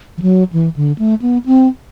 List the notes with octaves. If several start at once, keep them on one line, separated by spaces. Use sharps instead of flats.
E3
F#3
E3
D3
A3
B3
C4